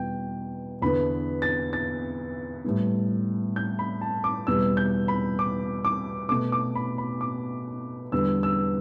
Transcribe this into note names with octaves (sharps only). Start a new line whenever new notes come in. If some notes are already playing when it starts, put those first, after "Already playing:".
Already playing: E2 B2 G3 G5
E2 D3 B3 B5
A6
A6
A2 G3 B3
G6
B5
A5
D6
E2 B2 G3 B3 E6
G6
B5
D6
D6
B2 A3 D6
D6
B5
B5
D6
E2 D3 G3 B3 E6
E6